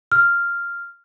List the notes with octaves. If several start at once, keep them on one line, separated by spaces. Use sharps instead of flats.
F6